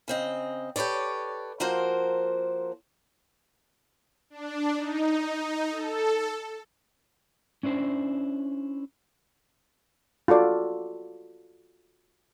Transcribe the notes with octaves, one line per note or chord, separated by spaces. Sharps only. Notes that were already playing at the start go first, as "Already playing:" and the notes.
C#3 C4 D#5
G4 A4 B4 C#5 D5
F3 A#3 F#4 A#4 C5
D4
D#4
A4
C#4 D4 E4 C5
F4 F#4 A4 D5